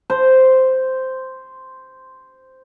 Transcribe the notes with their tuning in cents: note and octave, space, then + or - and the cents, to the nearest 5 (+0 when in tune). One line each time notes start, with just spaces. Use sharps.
C5 -5